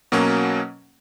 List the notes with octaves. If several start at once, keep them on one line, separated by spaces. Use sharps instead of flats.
B2 F#3 A#3 C#4